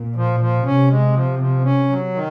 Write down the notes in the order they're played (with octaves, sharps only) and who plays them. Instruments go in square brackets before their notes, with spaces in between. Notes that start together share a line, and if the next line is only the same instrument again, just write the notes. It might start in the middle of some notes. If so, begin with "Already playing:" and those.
Already playing: [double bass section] A#2
[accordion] F3
F3
[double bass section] C3 [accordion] C#4
[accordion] G#3
F3
F3
C#4
F#3
D#3